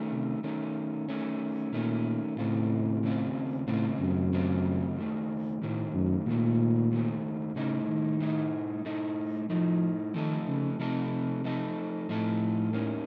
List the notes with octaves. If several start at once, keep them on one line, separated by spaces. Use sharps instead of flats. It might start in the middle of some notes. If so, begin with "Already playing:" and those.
Already playing: D#3 A3 C#4
C3
D#3 A3 C#4
D#3 A3 C#4
A#2 D#3 A3 C#4
D#2 A2 C#3 A3 C4 F4
D#2 C#3 A3 C4 F4
D#2 A2 C#3 A3 C4 F4
F#2
D#2 C#3 A3 C4 F4
D#2 D#3 A3
D#2 A2 D#3 A3
F#2
D#2 A#2 D#3 A3
D#2 D#3 A3
A2 C#3 A3 D#4
D#3
A2 A3 D#4
A2 A3 D#4
A2 F3 A3 D#4
D#3 F3 A3 D#4 A4
C#3
C3 F3 A3 D#4 A4
F3 A3 D#4 A4
A2 F3 A3 D#4 A4
D#2 D#3 A#3 C#4